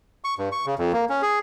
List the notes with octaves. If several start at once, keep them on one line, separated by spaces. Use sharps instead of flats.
C#6
G2
C#6
C#3
F2
A#3
C#4
G#4